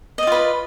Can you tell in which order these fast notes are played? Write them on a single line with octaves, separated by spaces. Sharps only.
D#5 D5 F4 B4